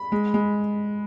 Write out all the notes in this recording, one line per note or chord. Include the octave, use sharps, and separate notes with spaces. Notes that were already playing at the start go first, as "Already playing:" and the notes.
Already playing: B5
G#3
G#3